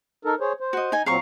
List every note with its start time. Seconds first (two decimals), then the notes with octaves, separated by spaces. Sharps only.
0.25 D#4 A4 A#4
0.40 G#4 C5 C#5
0.60 C5
0.73 F#4 D#5
0.92 D#4 G#5
1.06 A#2 F#3 C4 F5 A#5 C#6